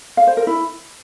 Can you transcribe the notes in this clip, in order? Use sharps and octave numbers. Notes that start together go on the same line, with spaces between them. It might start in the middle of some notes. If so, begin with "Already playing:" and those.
F5
C5
A#4
E4